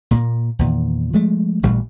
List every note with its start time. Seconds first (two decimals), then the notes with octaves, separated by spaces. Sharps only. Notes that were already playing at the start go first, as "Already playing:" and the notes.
0.11 A#2 A#3
0.59 E2 A#2 D#3
1.13 F3 G#3 A3
1.63 A1 A#2 G3